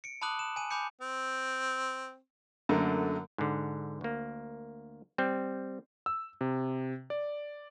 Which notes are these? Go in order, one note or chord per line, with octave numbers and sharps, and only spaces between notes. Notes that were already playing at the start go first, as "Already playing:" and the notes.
C#7 D7
A5 B5 D6 D#6 F#6 F#7
E7
G#5 D#7
G#5 B5 D6 G6 C#7
C4
F#2 D3 A3 A#3
G#2 D3
D2 A#3
G3 C4
E6
C3
D5